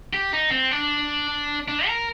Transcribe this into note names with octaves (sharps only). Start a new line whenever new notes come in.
G4
D#4
C4
D4
D4
A#4